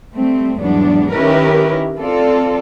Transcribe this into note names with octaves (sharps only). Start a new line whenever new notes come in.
G3 A3 C4
E2 G#2 F#3 G3 B3 D4
D#3 C#4 E4 G4 A#4 B4
C4 F4 A4 D5